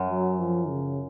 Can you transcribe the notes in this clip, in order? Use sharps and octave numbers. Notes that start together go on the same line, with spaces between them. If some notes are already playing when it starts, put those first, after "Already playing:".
Already playing: F#2
F#3
F3
C#3